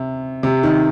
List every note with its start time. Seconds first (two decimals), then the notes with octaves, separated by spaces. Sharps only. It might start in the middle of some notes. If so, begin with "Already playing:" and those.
Already playing: C3
0.43 C3
0.63 D#3